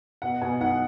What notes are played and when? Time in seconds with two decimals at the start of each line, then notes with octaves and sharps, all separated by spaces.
0.22 B2 F#5
0.41 B2 G#5
0.61 B1 F#5